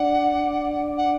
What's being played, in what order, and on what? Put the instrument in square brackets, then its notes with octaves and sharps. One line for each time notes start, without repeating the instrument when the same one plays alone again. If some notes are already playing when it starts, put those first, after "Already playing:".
Already playing: [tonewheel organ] D4 D5 [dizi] F#5
[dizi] F#5